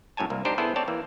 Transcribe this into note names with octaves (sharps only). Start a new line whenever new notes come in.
F#2 A2 C#5 G#5 A5
C2 A#3
C4 D4 D#4 G4 C5
B3 E4 G#4 A4 C5
C4 C#5 D5 A5
E3 A#3